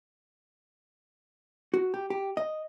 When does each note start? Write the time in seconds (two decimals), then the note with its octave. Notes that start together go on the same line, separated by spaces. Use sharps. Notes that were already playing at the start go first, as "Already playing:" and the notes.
1.74 F#4
1.94 G4
2.10 G4
2.37 D#5